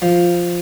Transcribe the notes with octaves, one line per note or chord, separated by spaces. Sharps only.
F3